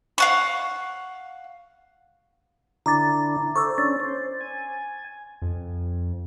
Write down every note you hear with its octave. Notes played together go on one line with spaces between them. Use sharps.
F5 F#5 C#6
D3 D4 E4 A#5 D6 A6
A4 C5 C#6 D6 E6
C#4 D4 A6
C5
G#5
F2